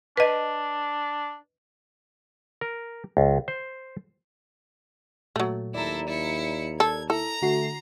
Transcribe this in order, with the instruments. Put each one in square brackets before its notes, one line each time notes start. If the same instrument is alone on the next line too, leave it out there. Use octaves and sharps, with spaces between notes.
[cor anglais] D4 [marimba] B4 D#5
[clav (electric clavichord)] A#4
C#2
C5
[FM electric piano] A#2 [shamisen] F#3 A3
[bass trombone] D#2 [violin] E4 A4 [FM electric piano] D5 A#5
[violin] E4 C#7
[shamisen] A4 [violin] G#6
[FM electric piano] E4 [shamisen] A4 [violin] A#5
[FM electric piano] D3 F#4 C7 [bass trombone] A3